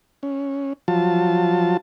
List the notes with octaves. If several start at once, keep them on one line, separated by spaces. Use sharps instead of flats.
C#4
F3 F#3 F4 A5